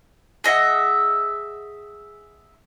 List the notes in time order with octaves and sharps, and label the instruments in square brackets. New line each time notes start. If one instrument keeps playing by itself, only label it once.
[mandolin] G#4 D#5 E5 F#5